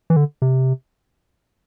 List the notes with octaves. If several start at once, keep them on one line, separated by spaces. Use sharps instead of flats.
E3
D3
C3